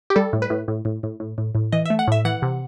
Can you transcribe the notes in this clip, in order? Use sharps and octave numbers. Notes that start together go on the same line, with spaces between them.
G4
G3 A4
A2
B4
A2
A2
A2
A2
A2
A2
A2
E3 D#5
E5
A3
F#5
A2 E5
E3 F#5
C3